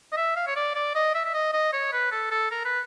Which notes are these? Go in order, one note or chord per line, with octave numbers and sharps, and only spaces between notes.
D#5
E5
F5
C#5
D5
D5
D#5
E5
E5
D#5
D#5
C#5
B4
A4
A4
A#4
B4